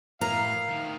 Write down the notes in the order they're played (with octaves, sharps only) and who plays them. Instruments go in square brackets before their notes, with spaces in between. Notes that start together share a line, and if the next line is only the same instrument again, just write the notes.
[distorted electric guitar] A2 [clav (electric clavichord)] A#4 [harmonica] F5 [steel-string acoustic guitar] A#5
[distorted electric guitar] D2 D#3